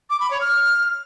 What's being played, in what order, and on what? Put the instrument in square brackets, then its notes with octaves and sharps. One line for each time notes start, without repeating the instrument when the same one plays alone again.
[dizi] D6
B5
C#5
F6